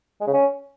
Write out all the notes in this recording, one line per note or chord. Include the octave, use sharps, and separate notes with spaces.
G#3
C#3
C#4